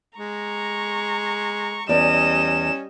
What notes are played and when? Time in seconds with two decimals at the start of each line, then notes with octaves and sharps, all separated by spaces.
0.18 G#3 A#5 C#6
1.89 E2 G3 C#4 D5 D#5 E7